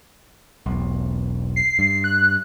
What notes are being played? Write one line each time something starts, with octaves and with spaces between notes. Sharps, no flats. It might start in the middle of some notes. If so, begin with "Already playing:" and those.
E1 B1
C7
G2
F#6